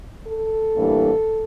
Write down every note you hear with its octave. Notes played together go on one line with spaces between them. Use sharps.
A4
A2 E3 G3 A#3 D4